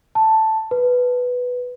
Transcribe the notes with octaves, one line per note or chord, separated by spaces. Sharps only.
A5
B4